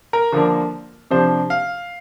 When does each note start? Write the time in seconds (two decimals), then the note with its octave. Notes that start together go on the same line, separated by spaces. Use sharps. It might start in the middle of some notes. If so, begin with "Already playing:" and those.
0.13 A#4
0.32 D3 F3 A#3 D4
1.11 C3 F3 D4 C5
1.50 F5